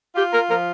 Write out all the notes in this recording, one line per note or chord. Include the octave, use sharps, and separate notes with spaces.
F4 G4
A#4
F3 A#4